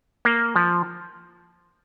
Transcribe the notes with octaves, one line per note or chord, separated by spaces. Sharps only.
A#3
F3